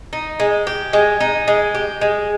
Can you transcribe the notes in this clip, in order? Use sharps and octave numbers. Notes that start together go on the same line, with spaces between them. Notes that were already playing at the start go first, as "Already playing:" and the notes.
D#4
G#3
G4
G#3
D#4
G#3
G4
G#3